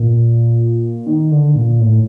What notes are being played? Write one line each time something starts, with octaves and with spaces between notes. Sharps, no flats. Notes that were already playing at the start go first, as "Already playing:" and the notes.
Already playing: A#2
D#3
D3
A#2
A2